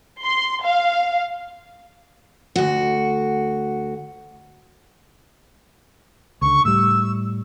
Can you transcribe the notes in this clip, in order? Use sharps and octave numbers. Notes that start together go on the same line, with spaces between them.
C6
F5
D2 F#4
C#2 D3 C#6
A2 G3 E6